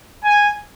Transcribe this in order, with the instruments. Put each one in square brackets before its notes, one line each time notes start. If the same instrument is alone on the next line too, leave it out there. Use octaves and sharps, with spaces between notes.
[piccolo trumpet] G#5